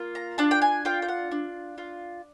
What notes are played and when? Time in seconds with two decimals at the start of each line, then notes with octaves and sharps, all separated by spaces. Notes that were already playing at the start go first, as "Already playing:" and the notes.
Already playing: A#3 F4
0.15 A#5
0.38 D4 A5
0.51 G5
0.62 G#5
0.85 F4 G5
1.02 G5
1.08 F#5
1.31 D4
1.78 F4